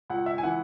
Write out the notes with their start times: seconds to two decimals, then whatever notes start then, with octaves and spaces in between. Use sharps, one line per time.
0.10 C#2 F#5
0.26 E5
0.38 G#5
0.43 E3 F#5